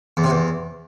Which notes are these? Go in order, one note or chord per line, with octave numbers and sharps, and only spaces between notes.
E2
C3
E2